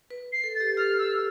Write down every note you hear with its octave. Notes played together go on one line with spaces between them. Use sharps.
B4
C7
A4
A6
G4
G4 F6
E6